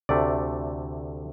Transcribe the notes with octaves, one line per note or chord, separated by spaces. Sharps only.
D2 C3 A3 D5